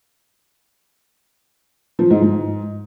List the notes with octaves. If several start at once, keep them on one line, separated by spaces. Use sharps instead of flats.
F3
G#2
G#2